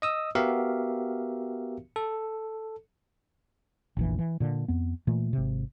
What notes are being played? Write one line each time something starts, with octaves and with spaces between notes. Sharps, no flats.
D#5 D#6 E6
B3 F#4 G4 A#4 E5 F5
A4
F1 A#1 E3
E3
A#2 D3
F2 B3
A#2 E3 A3
G#1 C3